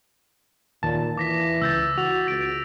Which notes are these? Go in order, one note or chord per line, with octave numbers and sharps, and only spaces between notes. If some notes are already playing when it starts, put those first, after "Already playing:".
D#2 A#2 A5
E3 D6 A#6 B6
C#2 E6 G6 A6
F#4 F7
C#2 A6 D7